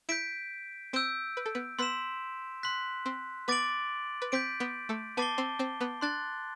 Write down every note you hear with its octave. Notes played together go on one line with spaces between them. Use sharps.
E4 G6 B6 D7
C4 C5 E6 G6 D7
B4
A4
B3 B4
B3 B4 C6 E6 B6 E7
C6 F#6 B6
C4 C5
B3 B4 D6 A6 D7 F#7
B4
C4 C5 G6 B6 D7
B3 B4
A3 A4
B3 B4 A5 D6 A6 C7 G7
C4 C5
C4 C5
B3 B4
D4 C6 F#6 A6